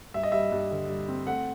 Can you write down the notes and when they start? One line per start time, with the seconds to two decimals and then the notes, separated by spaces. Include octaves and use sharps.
0.14 G2 E5
0.23 D#5
0.32 G3 E5
0.52 G2
0.71 D3
0.89 G3
1.08 C4
1.27 A3 F#5